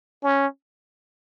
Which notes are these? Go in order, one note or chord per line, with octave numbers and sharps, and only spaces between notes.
C#4